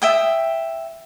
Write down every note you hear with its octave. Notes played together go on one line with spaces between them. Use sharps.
E5 G5 D#6